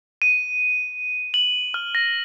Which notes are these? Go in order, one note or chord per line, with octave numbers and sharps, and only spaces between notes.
D#7
F#7
F6
A#6